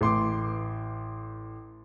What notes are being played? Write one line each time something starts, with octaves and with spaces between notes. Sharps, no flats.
A1 C6 D6